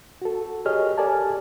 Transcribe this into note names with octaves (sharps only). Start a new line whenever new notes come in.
F#4 A4
G4 G#4 A#4 C#5 D#5 F6
G4 A4 A#4 D5 G#5 A5